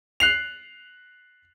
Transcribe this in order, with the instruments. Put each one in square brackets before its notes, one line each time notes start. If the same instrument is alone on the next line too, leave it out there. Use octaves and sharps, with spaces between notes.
[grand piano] F#6 C7 F7